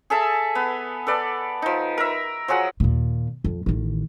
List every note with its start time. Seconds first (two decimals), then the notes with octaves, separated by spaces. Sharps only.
0.10 G#4 A4 E5 A5
0.55 B3
1.07 A4 B4 D5
1.62 F3 D#4
1.98 A#4 E5
2.48 F3 F#3 G#4 F#5
2.80 D#2 A#2
3.44 F2
3.66 A1 D#3